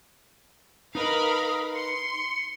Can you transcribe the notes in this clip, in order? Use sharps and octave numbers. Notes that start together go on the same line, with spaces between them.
D#4 A#4 B4 D#5 F5 B5 D#6
C6 C#7